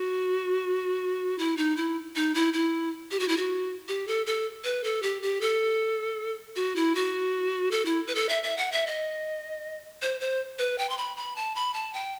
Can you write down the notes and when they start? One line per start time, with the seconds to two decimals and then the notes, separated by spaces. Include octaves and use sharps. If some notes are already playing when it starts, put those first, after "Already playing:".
Already playing: F#4
1.39 E4
1.57 D#4
1.77 E4
2.16 D#4
2.34 E4
2.53 E4
3.11 G4
3.20 F#4
3.28 E4
3.37 F#4
3.88 G4
4.08 A4
4.26 A4
4.64 B4
4.84 A4
5.03 G4
5.22 G4
5.41 A4
6.56 F#4
6.76 E4
6.95 F#4
7.71 A4
7.85 E4
8.07 B4
8.15 A4
8.29 E5
8.43 E5
8.57 F#5
8.72 E5
8.87 D#5
10.02 C5
10.21 C5
10.59 B4
10.78 G5
10.90 C6
10.98 B5
11.17 B5
11.36 A5
11.55 B5
11.74 A5
11.93 G5